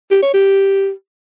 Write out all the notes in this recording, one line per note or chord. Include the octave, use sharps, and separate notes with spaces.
G4
C#5
G4